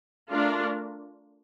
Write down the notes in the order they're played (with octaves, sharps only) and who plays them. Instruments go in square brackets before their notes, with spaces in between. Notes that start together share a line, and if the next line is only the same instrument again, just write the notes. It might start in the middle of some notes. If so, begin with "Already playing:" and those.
[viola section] A3 D4 F4 A#4 D5